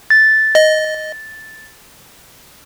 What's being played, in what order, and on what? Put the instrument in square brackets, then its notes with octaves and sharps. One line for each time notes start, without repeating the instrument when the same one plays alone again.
[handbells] A6
[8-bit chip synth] D#5